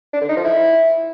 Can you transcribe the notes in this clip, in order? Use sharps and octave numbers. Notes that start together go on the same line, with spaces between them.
D4
D3
D#4
F3
E4